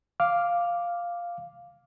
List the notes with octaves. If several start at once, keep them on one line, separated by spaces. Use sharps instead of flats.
F5 D6 F6